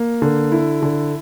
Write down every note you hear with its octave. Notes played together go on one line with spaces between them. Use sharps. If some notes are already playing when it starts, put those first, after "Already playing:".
Already playing: A#3
D3
E4
D3